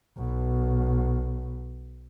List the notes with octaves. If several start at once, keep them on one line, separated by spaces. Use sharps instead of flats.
B1 B2